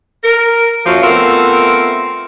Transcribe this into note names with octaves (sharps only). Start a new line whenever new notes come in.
A#4
F#2 F3 F#3 A#3 F4
A3 B3 C4 F4 A#4